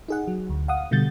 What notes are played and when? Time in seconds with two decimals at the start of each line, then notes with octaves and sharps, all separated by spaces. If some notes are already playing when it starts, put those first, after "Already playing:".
0.08 D#4 G#4 F#5
0.28 F#3
0.50 D2
0.68 F5 F#5 D#6
0.91 B2 D3 G3 G6 A6